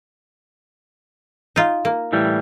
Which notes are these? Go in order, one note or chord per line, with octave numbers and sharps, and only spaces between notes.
D#4 F4
A#3
A2 E3 G3